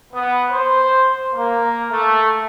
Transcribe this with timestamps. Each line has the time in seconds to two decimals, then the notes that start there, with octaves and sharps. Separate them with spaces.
0.13 B3
0.51 C5
1.34 A#3
1.92 A3